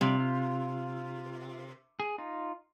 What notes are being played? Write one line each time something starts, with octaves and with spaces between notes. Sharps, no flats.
C3 G3 F4 D5
F4
G#4
D#4 F4